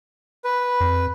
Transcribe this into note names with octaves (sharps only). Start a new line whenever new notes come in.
B4
F2